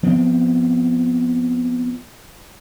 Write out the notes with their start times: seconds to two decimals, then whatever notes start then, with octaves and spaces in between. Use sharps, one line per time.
0.03 F3 B3 C4